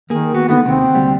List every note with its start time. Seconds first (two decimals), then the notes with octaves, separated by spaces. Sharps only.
0.10 D#3 A#3 G#4
0.34 B3 F#4
0.49 D3 D#3 A3 B3
0.65 D#2 C3 C4
0.95 D2 G3